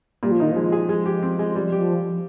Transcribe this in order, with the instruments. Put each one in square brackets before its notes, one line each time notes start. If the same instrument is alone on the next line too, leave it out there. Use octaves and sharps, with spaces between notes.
[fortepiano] A#2 [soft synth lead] G3
[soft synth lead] F3
[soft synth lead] D#3 [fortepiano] D#4
[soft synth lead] F3 [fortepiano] G#3
[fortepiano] G#4
G#3
G4
C4
G#3
G3
G4
[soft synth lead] F3